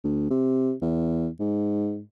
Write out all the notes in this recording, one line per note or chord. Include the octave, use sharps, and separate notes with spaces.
D2
C3
E2
G#2